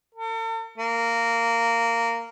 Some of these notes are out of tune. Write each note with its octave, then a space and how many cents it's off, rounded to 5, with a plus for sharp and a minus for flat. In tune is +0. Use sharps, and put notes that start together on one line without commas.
A4 +45
A#3 -10